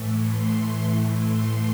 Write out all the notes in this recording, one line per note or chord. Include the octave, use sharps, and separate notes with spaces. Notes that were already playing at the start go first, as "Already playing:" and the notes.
Already playing: A2 E3 A3
C6
C6